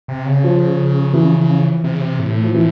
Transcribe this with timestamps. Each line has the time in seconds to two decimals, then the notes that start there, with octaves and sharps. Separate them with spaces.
0.08 C3
0.26 C#3
0.44 F3
1.13 E3
1.84 C3
1.93 C#3
2.02 C3
2.19 A2
2.44 F3
2.54 A2 E3